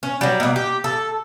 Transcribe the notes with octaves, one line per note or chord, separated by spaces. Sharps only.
C#4
F#3 G3
B2 A#3
G4
A4